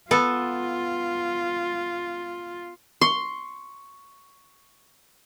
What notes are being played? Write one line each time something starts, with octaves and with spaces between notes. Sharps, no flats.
B3 F4 A4
C6 C#6